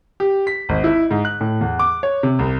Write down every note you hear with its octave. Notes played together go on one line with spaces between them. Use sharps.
G4
B6
G#1
E4
G#2
F#6
A2
E2
D6
C#5
C3
C2